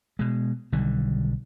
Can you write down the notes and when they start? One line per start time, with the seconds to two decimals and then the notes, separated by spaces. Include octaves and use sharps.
0.19 B2 G#3
0.72 B1 D3 D#3 G3